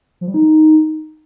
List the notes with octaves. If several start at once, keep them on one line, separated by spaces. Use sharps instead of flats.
F3
G3
D#4